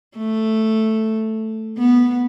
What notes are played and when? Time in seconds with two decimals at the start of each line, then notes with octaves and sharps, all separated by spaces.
0.17 A3
1.78 B3